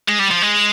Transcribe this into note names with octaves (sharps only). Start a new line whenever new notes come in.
G#3
G3
F3
G#3